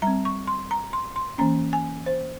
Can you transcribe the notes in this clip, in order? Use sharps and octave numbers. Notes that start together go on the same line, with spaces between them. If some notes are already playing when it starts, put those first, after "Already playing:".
G3 C4 A#5
C#6
C6
A#5
C6
C6
E3 A#3 C#4 A#5
G#5
C5